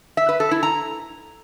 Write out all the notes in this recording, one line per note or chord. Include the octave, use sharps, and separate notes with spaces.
E5
B4
A4
E4
A#5